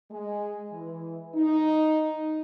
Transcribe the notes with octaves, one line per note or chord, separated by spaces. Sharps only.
G#3
E3
D#4